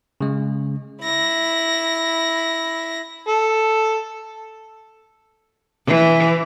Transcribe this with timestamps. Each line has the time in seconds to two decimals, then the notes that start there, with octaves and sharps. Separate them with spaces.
0.21 C#3 G#3
1.02 E4 A#6
3.28 A4
5.86 E3